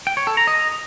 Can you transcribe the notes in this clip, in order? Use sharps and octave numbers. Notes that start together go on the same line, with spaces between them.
G5
C#5
A4
A#5
D#5